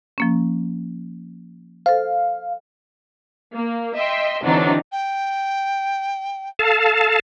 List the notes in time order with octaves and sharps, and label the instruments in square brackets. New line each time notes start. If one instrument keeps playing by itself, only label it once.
[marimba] F3 A#3 C#4
[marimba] A4 C5 [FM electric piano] F5
[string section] A#3
D#5 E5 G5 C6
D3 E3 F#3 C4 D4 D#4
[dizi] G5
[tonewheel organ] A4 F5 A5